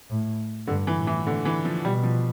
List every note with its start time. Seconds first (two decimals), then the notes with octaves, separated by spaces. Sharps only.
0.10 A2
0.67 G2 D3
0.87 E3
0.97 A2
1.07 E3
1.27 D3
1.45 E3
1.65 F3
1.84 B2 G3
2.03 F3